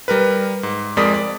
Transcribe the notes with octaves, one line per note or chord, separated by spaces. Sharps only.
G3 A#4 B4
G#2
F2 G#3 A#4 D5 D#6 B6
D5